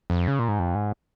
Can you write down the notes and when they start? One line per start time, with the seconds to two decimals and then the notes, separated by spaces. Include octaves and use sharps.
0.10 F2
0.28 C#3
0.39 A#2
0.48 G#2
0.59 F2
0.75 G#2